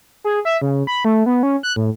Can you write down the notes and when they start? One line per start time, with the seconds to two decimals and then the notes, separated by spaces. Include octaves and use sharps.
0.24 G#4
0.45 E5
0.62 C#3
0.87 B5
1.05 A3
1.26 B3
1.43 C#4
1.63 F#6
1.76 A2